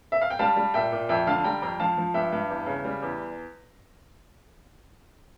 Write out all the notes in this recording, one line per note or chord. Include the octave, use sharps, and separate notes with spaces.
E5
F5
G5
G3 F5 A5
G3
A#2 E5 G5
A#2
F2 E5 G5
D3 F5 A5
G3 G5 A#5
F2 G5 A#5
F3 F5 A5
F3
G2 E5 G5
G2
E2
C#3
G3
E2